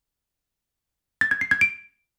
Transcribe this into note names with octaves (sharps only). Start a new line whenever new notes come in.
A6
G#6
C7
G#6
D7